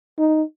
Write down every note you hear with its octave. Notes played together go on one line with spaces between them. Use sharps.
D#4